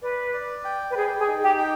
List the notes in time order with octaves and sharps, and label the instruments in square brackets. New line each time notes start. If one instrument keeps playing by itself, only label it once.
[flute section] B4 [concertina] D5
[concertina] D5
G5
[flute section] B4
[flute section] G#4 [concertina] G5
[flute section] G#4
[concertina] D#4
[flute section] G4
[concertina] G5